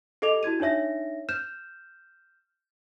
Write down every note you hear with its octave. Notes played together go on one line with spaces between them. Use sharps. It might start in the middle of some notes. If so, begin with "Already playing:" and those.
G4 A4 D#5 D6 F7
E4 F#4 G#6 D#7
D4 D#4 C#5 E5 A#6
F6 G6 E7